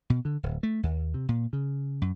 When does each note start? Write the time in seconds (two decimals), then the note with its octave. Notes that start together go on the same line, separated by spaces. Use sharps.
0.10 B2
0.25 D3
0.43 D1
0.63 A3
0.83 D#2
1.14 C3
1.29 A#2
1.53 C#3
2.02 F#2